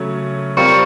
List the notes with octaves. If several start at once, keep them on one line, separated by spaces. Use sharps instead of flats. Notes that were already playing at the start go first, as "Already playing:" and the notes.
Already playing: C#3 F#3 A3 C#4
G3 C4 F4 A#4 C#6 C#7